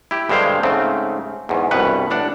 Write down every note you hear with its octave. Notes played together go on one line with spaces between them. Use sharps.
E4 G4
G2 D3 G#3 C5 F5 G5
G#2 C#3 A3 C4
E2 G#2
C2 G2 B2 B4 F#5
A1 D4 F#5